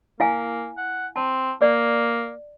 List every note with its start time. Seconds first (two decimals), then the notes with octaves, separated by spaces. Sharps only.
0.20 A#3 E4 F5 G#5
0.77 F#5
1.16 C4 A5
1.62 A#3 D5